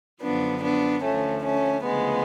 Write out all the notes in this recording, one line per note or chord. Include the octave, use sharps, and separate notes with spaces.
F#2 D3 F3 B3 D4
B3 D4
D2 D3 F3 A3 C#4
A3 C#4
D2 C#3 F3 G#3 B3